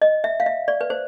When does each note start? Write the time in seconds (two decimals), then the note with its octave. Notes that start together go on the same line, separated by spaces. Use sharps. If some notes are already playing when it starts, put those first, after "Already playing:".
0.02 D#5
0.24 E5
0.40 F5
0.46 E5
0.68 D5
0.81 B4
0.90 C5